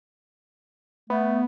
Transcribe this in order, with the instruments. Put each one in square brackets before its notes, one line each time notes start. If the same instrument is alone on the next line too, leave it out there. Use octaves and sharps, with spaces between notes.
[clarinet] A3 [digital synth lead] B3